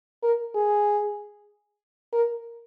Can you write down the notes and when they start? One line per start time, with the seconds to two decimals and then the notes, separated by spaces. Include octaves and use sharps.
0.23 A#4
0.55 G#4
2.13 A#4